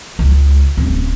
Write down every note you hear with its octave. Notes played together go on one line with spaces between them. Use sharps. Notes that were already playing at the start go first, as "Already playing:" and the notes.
C#2
D1 C#4